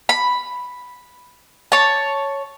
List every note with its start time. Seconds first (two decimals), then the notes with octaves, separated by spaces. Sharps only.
0.09 B5
1.72 C#5 A5